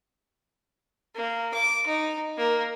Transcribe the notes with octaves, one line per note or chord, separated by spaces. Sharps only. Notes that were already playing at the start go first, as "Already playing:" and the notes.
A#3
D6
D#4
A#3